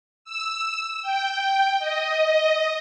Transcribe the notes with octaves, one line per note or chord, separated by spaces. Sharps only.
E6
G5
D#5